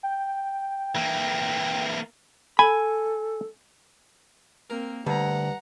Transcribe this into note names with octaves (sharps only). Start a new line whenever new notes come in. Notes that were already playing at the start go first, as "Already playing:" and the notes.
G5
E3 A#3
A4 G#5 B5
A#3 C4 A#4
D2 G2 F#5 A#5